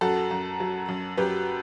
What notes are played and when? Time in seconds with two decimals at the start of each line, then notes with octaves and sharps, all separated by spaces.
0.01 F#2 F#4 A4
0.31 F#2
0.60 F#3
0.88 F#2
1.17 F#2 G4 B4